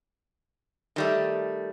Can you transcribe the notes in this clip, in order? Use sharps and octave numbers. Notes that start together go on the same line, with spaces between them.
D#3 G3 A3